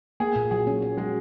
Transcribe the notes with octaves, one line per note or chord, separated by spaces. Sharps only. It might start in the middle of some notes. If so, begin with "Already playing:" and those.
A#3 G#4
A#2
F#3 G#4
C#4
C#4
F#3 G#3